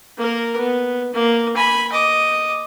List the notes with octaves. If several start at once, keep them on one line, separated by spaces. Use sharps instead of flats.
A#3 A#4
B3
A#3
G#5 B5
D#5 D6